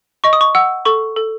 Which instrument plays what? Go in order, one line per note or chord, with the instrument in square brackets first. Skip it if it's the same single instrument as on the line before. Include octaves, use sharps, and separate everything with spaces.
[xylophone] D#5 C#6
D#6
C#6
F#5 E6
A4 C#6
A4